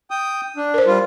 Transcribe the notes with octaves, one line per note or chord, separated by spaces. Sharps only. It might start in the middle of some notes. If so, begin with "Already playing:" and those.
G5 D#6
D4
A#4 C5
G3 F4